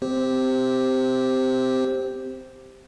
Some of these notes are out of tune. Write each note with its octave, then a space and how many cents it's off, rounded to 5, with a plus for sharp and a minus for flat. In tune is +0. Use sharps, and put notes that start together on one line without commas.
C4 -20 G4 +0 C5 +0